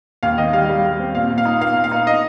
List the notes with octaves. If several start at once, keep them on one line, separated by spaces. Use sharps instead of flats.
D#2 F5
D#3 D#5
G3 F5
G3
G3
C4
A#2 F5
A#2
F5
D#4
A#3 F5
A#2
F5
D#4
D#5